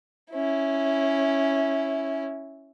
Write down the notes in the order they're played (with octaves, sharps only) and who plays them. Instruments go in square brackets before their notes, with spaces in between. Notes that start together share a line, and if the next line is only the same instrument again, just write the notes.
[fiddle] C#4 E4